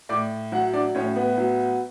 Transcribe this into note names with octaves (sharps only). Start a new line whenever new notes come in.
A2 D5 D6
F#3 F#4 F#5
D4 D5
A2 C#4 C#5
B3 B4
F#3